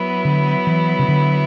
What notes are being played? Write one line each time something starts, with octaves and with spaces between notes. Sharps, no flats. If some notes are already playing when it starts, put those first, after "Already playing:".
Already playing: F#3 B3 E4
D3
E3
C#3
D3